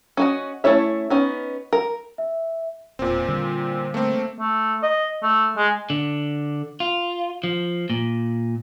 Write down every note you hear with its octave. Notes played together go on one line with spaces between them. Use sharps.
C#4 F#4 D#5
A3 C#4 E4 C#5 E5
B3 C#4 D#4
A#4
E5
E1 A#2 C4
D3 G3
A3 A#3 C4
A3
D#5
A3
G#3
D3
F4
F3
A#2